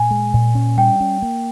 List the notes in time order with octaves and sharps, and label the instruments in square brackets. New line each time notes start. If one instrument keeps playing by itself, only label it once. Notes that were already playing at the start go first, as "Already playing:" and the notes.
Already playing: [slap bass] A#2 [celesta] G#5
[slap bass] G#3
A#2
C#4
[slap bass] G3 [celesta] G5
[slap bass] C#4
A#3